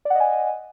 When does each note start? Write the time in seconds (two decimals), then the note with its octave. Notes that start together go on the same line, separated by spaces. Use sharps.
0.05 D5
0.10 F#5
0.15 D#5
0.20 G#5